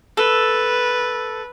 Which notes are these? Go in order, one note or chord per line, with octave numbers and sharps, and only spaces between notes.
A4 B4